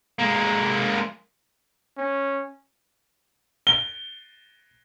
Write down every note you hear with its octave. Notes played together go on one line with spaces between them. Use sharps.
G#3 A#3
C#4
G7